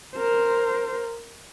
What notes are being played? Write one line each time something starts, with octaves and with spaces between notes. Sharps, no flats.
A#4 C5